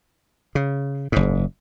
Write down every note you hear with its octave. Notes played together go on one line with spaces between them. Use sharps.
C#3
F#1 G#2